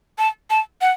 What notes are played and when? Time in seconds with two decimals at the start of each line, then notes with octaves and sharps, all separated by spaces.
0.18 A5
0.50 A5
0.81 F#5